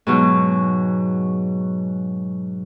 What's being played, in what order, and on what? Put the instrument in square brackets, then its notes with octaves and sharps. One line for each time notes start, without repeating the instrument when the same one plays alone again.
[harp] G#2 B2 F#3 G#3